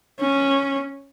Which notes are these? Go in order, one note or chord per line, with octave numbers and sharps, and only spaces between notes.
C#4